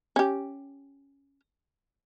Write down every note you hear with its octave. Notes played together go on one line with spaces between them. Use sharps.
C#4 G4